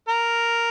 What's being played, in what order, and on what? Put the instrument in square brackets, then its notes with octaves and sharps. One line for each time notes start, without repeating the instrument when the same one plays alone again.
[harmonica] A#4